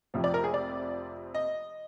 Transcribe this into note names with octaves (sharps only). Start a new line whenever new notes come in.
F1 F2 C3 F3
D5
A#4
G#4
D5
D#5